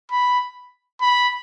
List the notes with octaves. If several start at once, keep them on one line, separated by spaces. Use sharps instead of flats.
B5
B5